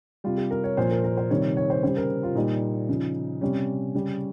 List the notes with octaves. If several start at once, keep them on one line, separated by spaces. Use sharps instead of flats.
C3 G3 F4
G4
A#4
C#5
A#2 F3 C5
A#4
A#4
C5
C3 D#3 G3 C#5
C#5
C5
C#3 G3 C5
A#4
F4
A#2 G3 D#4
C#3 F3
C3 G3 C#4
C#3 G3